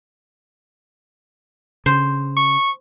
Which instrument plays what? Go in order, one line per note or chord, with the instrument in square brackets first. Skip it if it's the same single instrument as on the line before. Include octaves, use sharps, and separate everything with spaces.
[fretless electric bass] C#3 [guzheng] C5
[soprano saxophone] C#6